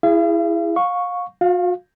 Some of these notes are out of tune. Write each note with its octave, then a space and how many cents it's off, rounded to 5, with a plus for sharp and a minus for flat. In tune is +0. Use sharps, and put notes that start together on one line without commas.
E4 +10 G#4 -15 F5 -45
F5 +30 C#6 +0
F#4 -45 F5 +0